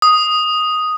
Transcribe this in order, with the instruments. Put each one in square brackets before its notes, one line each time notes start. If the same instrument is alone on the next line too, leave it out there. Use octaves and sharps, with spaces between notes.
[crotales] D#6